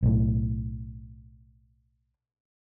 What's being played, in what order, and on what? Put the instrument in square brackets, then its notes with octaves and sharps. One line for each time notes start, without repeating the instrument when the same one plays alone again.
[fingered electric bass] B1 A2